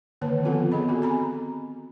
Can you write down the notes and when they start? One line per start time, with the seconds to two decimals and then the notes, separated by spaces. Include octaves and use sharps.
0.21 D3 D#3 A#3 B4 C#5 A5
0.43 F3 B3 C4 F4 A4 F#5
0.72 B3 G#4 D#5 B5
0.88 C4 F#4 A4
1.02 G#5 A#5 B5